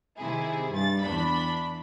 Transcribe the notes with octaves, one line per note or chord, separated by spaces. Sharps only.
C3 D#3 E4 G#4
G2 A6
E2 D4 B5